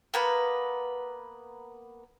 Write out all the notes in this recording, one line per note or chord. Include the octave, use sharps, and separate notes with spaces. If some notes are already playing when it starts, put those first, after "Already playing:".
A#3 B3 B4